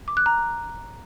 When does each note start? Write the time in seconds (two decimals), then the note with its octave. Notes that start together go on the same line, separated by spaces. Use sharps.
0.08 D6
0.17 F#6
0.26 A#5